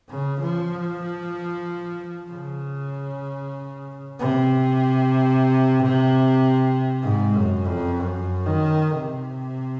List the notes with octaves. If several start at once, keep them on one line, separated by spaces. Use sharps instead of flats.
C#3
F3
C#3
C3
G#2
F#2
F2
F#2
D#3
C3